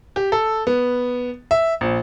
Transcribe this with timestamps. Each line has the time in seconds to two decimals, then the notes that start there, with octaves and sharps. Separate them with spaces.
0.16 G4
0.32 A4
0.67 B3
1.51 E5
1.81 A#1